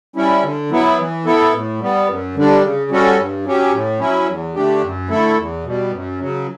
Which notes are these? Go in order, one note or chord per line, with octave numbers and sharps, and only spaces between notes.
G3 C#4 E4
D3
F#3 B3 E4
E3
B3 E4 A4
A2
G3 B3
F#2
D3 G3 D4
C#3
G3 C#4 F#4 A4
G2
F#3 C#4 G4
A2
F#3 C#4 E4
E2
D3 A3 D4 G4
F#2
D3 A3 E4 A4
E2
B2 G3
F#2
C#3 F#3